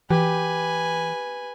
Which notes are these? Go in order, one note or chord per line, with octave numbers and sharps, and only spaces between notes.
E3 G4 B4 G#5